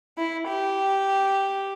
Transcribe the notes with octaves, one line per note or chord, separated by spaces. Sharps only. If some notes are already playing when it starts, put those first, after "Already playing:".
E4
G4